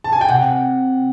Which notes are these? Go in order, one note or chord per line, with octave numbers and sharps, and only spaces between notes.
A5
G#5
G5
C3 F#5